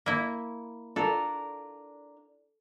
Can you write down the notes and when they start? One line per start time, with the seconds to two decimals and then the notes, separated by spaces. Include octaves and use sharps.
0.06 A#3 E4
0.96 D4 F4 A4 A#4